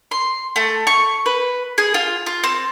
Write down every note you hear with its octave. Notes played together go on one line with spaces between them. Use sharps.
C6
A3
C#6
B4
G#4
F4
F4
C4